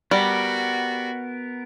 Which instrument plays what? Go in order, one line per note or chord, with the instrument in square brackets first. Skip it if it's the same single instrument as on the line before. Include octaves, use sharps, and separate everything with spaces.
[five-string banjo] G3 [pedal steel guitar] B3 A#4 [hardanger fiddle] F#4